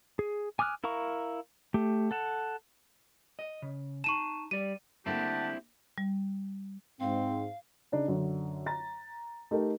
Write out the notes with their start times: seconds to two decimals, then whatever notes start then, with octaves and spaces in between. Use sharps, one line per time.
0.19 G#4
0.59 G#5 D6 D#6 F6 F#6
0.84 E4 A#4 F5 A#5 C#6
1.74 A3 G4
2.11 A4 F#5 A5
3.39 D#5
3.62 C#3
4.04 D#4 A5 C#6 D#7 E7
4.51 G3 D5 D#7
5.06 D3 A3 A#3 C4 E4 G4 F#5 A5
5.98 G3
7.01 G#2 C4 F5
7.92 C#3 D4 D#4
8.08 F#2 D3
8.66 A#5 A6
9.51 A3 D#4 G4 A4 A#4